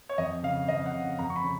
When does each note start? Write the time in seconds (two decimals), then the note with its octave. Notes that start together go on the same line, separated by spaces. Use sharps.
0.09 C#5
0.18 F2 D#5
0.43 C#3 F5
0.68 F2 D#5
0.86 F#5
0.93 C#3
1.19 F2 A#5
1.30 C#6
1.36 B5
1.43 C#3